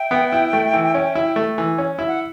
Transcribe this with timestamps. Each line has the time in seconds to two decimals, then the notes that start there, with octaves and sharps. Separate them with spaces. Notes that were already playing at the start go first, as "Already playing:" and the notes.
Already playing: E5 G5
0.11 B3
0.33 E4
0.53 A3
0.73 E3
0.95 C#4
1.15 E4
1.36 A3
1.58 E3
1.78 C#4
1.99 E4
2.09 F#5